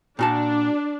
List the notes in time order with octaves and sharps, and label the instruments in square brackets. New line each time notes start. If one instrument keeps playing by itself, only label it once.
[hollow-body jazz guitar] A#2 F#4 A5 [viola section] D4